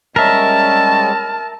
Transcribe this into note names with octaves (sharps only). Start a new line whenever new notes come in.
G3 G#3 C#4 A#4 E5 A5